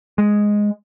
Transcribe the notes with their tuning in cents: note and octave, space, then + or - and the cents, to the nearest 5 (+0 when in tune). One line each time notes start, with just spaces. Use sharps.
G#3 +0